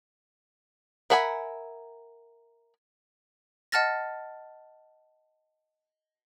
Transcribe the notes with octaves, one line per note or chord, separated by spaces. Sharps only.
A#4 E5 F#5 G#5 B5
D#5 F#5 A5 F6 A6 A#6